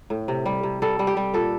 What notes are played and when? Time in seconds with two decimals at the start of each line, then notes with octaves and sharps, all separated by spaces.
0.10 A2
0.28 C3
0.46 G3
0.63 C3
0.82 G3 A4
0.99 G3
1.07 G4
1.17 G3
1.34 A#2 A4